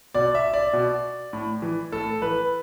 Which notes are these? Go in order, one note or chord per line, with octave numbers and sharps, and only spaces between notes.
B2 D5
E5
D5
B2
A2
E3
A2 A4
E3 B4